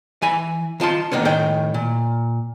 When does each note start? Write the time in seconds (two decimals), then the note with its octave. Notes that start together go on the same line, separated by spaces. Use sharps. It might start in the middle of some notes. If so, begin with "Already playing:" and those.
0.22 E3 G#5 B5
0.80 D#3 F4 A5 C6
1.12 D3 D#3 A#3 B3 C#4
1.25 A2 D#3 G5
1.74 A#2